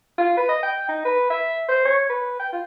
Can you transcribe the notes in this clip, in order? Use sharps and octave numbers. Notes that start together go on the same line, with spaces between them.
F4
B4
D#5
G5
D#4
B4
E5
C5
C#5
B4
G5
F4